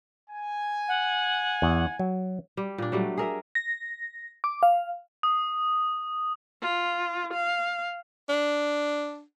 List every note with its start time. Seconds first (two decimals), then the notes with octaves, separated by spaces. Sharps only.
0.29 G#5
0.88 F#5
1.62 E2
1.99 F#3
2.57 G3
2.78 A#2 D4
2.92 F#3 G3 A3
3.18 G#4 A#4 E5
3.55 A#6
4.44 D6
4.63 F5
5.23 D#6
6.62 F4
7.33 F5
8.29 D4